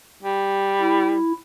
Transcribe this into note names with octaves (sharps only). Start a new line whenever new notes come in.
G3
E4